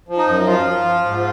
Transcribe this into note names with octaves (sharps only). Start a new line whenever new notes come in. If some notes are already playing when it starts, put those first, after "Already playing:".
F3
D#4
F#2
F3 F4
F3
F3
G#2